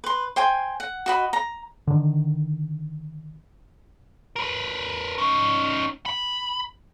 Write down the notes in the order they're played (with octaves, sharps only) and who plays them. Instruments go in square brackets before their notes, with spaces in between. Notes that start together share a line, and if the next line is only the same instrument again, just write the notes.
[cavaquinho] B4 C6
C5 G5 G#5 C6
F#5
F#4 D#5 B5
A#5
[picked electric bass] D3 D#3
[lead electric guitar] A#4 B4
C#4 D#4
B5